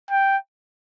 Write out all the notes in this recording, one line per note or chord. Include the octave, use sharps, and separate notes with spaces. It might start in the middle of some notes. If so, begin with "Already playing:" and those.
G5